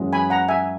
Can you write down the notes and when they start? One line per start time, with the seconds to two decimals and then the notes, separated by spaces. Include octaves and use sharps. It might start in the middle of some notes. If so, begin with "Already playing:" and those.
Already playing: F#2 E3 G#3 C#4 F#4
0.13 G#5 B5
0.30 F#5 A#5
0.48 E5 G#5